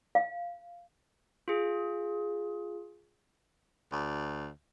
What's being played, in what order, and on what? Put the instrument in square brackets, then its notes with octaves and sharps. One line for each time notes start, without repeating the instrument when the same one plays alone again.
[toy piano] F5
[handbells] F4 G#4
[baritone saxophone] D2